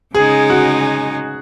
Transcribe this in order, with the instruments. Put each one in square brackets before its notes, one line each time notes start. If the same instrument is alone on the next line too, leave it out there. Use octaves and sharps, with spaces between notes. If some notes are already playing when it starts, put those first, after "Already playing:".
[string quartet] C#3 G#3 D#4 [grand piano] G#4
[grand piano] F#4